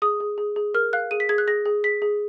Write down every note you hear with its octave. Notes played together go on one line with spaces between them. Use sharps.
G#4 D#6
G#4
G#4
G#4
A#4 F6
F5 F#6
G#4 D#7
B6
G#4 G#6
F#6
G#4 A#6
G#4
G#4 B6
G#4